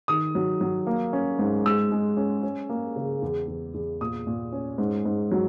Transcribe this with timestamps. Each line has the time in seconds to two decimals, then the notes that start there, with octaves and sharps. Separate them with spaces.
0.08 D#3 D#6
0.35 F#3
0.61 F#3
0.87 A#3
1.13 C#4
1.39 G#2
1.65 G#3 E6
1.92 G#3
2.17 C#4
2.43 C#4
2.69 A#3
2.96 C#3
3.22 E2
3.48 E2
3.74 E2
4.01 A#2 D#6
4.27 A#2
4.53 C#4
4.78 G#2
5.06 G#2
5.32 F#3